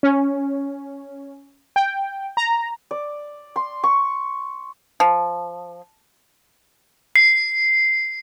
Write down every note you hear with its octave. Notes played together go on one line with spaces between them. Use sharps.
C#4
G5
A#5
D5
C6
C#6
F3
C7